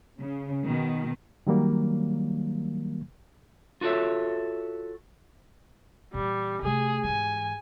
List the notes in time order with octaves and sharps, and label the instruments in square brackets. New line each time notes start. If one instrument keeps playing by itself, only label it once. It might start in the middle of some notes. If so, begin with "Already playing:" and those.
[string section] C#3
B2 D#3
[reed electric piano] D#3 F#3 G3 A#3
[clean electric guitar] F4 F#4 A4 C#5 E5
[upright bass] A#2 E3 [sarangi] G3
[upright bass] C3 A3 [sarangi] G#4
[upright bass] G#2 E3 [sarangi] G#5